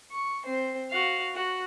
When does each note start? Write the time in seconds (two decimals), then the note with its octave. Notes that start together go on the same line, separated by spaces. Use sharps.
0.11 C#6
0.45 C4 C5
0.91 F#4 F5
1.34 F#4